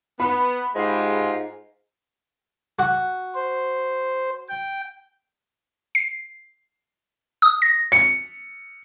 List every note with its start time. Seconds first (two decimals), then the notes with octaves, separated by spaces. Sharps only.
0.20 B3 B5
0.75 G#2 G#3 F4 G4
2.79 F#4
3.35 C5
4.49 G5
5.95 C7
7.42 D#6
7.62 A#6
7.92 C#7